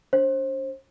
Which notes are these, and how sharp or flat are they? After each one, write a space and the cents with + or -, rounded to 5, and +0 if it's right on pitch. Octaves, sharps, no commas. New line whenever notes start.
D4 -25 C5 +30